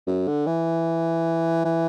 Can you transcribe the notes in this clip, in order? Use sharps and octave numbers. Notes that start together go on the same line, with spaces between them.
F#2
D3
E3
E3